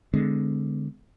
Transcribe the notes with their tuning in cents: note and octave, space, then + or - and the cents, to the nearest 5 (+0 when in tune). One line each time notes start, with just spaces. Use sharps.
D3 +0 G#3 +0 B3 +45